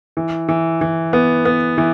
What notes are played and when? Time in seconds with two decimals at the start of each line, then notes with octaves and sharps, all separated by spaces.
0.17 E3
0.49 E3
0.81 E3
1.13 B3
1.45 B3
1.78 E3